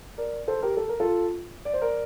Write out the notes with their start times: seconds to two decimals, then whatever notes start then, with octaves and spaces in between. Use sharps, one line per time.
0.18 A#4 D5
0.48 A4 C5
0.62 G4 A#4
0.77 A4
0.89 A#4
1.00 F4 A4
1.65 D5
1.74 C5
1.82 A#4 D5